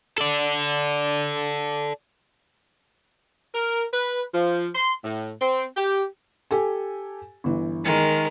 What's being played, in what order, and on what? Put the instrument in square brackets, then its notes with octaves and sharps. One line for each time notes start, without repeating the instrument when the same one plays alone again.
[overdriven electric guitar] A4 D5
[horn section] A#4
B4
F3
C6
A2
C4
G4
[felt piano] G4 A4 G#5
G1 E3
[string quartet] D#3 G#3 A#4